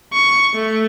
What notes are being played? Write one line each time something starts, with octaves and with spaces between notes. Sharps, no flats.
C#6
A3